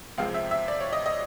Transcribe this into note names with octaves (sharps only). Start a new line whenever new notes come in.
C#2 C3 F3 G#3 C4 F5
E5
E5
D5
C#5
D#5
D#5